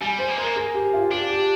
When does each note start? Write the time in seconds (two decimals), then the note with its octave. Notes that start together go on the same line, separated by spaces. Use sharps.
0.01 G3 G#5
0.19 C5
0.28 A#3
0.37 G#3 A#4
0.46 A#3
0.56 G#4
0.74 G4
0.93 F4
1.11 D4 G4
1.29 G4